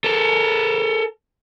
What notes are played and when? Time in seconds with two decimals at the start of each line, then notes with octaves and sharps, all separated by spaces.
0.04 A4 A#4